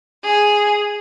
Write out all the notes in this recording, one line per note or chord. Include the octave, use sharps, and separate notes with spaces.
G#4